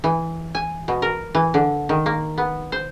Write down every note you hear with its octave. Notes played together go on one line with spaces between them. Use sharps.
E3
G#5
B2
A#4
E3
D3
D#3
A#3
B3
C5